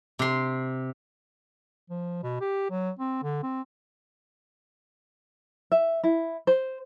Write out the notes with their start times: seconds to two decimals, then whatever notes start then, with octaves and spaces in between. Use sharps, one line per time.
0.19 C3 C6
1.90 F3
2.23 B2
2.41 G4
2.70 F#3
2.99 C4
3.23 D3
3.43 C4
5.72 E5
6.04 E4
6.47 C5